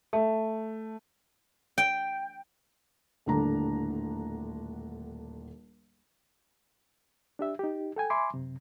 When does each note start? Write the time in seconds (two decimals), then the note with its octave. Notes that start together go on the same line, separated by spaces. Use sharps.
0.13 A3
1.78 G5
3.26 D#1 A2 D3 D4 A#5
7.39 D4 G4 E5
7.59 D#4 G4
7.96 A4 G5 G#5
8.10 E5 G#5 B5 C6 D6
8.34 F#2 C3